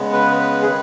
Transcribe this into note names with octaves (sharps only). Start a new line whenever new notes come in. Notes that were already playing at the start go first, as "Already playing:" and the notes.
Already playing: C#3 G#3 B3
B4
B4
G#4
D#3 B4